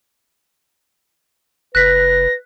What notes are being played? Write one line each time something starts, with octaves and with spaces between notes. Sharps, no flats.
F1 B4 F#6 A#6 B6